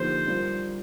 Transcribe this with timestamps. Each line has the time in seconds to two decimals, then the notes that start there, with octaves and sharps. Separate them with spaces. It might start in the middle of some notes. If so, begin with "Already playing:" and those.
Already playing: D3 F3 A#3 D#4 G4 C5
0.26 G3 D4 F4 A#4